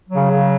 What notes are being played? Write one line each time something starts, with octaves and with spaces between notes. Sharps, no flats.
F#3
C#3
C#3